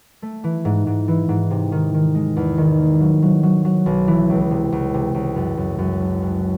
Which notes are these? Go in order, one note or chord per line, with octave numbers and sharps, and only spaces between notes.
A3
E3
G#2
G#2
E3
G#2
C3
D#3
D#3
G#3
E2
D#3
A#3
F#3
F#3
F#3
F#3
B1
E3
C#2
C3
C#2
C3
C#2
F#2
F#2
F#2
F#1
F#1